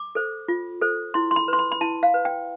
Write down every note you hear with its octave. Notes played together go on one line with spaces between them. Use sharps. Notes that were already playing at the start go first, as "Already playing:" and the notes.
Already playing: D6
A4 C5
F4
A4 C5
E4 C6
C6
B5
B4
C6
B5
B5
E4 A5
F5
B4
G5